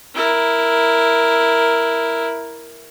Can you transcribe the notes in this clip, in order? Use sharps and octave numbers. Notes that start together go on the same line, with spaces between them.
E4 A#4